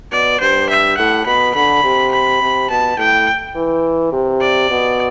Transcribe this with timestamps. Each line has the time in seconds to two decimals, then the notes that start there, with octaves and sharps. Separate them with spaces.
0.12 B2 D5
0.41 G2 C5
0.69 E5
0.98 A2 F#5
1.26 B2 B5
1.55 D3 B5
1.84 C3
2.12 B5
2.41 C3
2.70 B2 A5
2.98 A2 G5
3.56 E3
4.12 C3
4.41 D5
4.70 B2